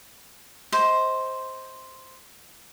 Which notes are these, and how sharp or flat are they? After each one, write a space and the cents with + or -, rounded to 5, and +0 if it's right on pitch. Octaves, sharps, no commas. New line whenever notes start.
C5 +0 D#5 +30